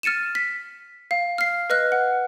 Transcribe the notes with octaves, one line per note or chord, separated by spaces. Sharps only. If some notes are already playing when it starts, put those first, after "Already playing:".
F6 A6 C#7 D#7 E7
B6
F5
F6 C7
B4 D#5 F6 F#6
F#5